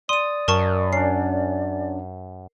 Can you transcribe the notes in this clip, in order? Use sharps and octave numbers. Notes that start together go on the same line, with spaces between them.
D5 C6 D#6 D#7
F#2 A#4 A5 C#6
C#4 D4 C7